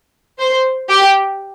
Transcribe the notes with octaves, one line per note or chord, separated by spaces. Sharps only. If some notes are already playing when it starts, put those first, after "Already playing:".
C5
G4